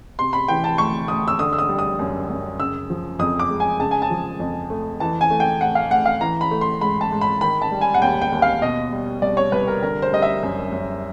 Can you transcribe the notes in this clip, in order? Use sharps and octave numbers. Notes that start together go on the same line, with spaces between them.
C3 C6
B5
E3 G5
A5
D2 C#6
D2 D#6
E6
D3 D#6
E6
D#6
G3
D#6
F#2
F#2
C#3 E6
F3
F2 D#6
D6
G#3
G#5
C#3 A5
G#5
A5
F3
F2
A3
E3 A5
G#5
A3
G5
A2 F#5
F5
A2 F#5
F5
E3 A#5
B5
A3
C6
G#2 B5
A5
G#2
B5
D#3 B5
A5
G3
G#5
F#5
D#2 G5
G5
D#2
F5
B2 D#5
G3
C2 D5
C#5
C2 B4
A#4
D3 A#4
C5
G3 D#5
E5
F#2
F#2